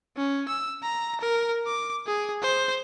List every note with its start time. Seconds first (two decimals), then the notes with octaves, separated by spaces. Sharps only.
0.17 C#4
0.48 E6
0.82 A#5
1.21 A#4
1.66 D6
2.06 G#4
2.42 C5